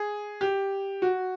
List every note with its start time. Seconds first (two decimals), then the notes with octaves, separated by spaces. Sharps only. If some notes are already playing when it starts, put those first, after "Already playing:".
Already playing: G#4
0.41 G4
1.02 F#4